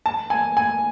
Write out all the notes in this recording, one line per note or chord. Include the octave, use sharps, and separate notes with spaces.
A5
G#5
G#5